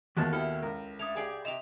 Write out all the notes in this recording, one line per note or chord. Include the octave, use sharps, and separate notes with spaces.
D#2 B2 D#3 E3 G#3 A5 F#6 A6
E4 G4 A4 B5 F6
C#2 A#4
A3 D4 D#6 G#6 F7
G4 G#4 D5
C3 G4 D#5 E5 E7 F7